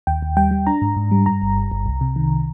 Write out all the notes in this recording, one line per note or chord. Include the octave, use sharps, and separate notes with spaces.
D#2 G5
D#2
G3 G5
G3
D4 A#5
G#2
G#2
G3
G2 A#5
G1
G1
G1
C2
C3
D#3